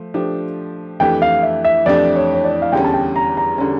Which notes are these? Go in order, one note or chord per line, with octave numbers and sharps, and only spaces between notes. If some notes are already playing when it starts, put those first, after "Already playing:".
Already playing: F3 A3
F3 A3 D4 G4
F2 E3 A3 D4 G4 G5
F5
E5
E5
F2 E3 A3 D4 G4 D5
C#5
C#5
D5
F5
E2 D3 G3 C#4 G5
A5
G5
A#5
A#5
D3 G3 C#4